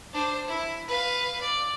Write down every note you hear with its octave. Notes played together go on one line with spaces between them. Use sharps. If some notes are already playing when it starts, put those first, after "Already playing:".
D4 C5
E4
B4 F5
D5